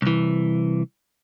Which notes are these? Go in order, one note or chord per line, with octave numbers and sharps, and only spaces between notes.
C2 E3